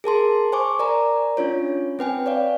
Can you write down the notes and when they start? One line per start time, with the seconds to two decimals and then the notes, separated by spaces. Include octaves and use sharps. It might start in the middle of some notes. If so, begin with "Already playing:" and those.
0.04 G#4 A#4 A5 C6
0.52 C5 G#5 C#6 D6
0.79 A#4 D5 G#5 A#5
1.37 C#4 D4 F4 C#5
1.99 C4 B4 G5 G#5
2.26 C#5 D5 F5